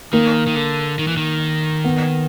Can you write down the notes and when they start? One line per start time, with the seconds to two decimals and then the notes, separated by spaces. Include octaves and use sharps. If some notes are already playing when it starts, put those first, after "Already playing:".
0.13 D#3 A#3
0.47 D#3
0.56 D3
0.99 D#3
1.08 E3
1.17 D#3
1.84 B3